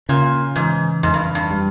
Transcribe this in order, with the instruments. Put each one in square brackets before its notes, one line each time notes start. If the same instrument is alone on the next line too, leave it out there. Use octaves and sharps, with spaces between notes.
[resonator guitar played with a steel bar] A#2 [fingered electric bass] C#3
[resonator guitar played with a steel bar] G#2 [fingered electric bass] E3
[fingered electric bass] F2 [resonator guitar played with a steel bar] G#2
[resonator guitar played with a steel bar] G2
G2
[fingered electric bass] G3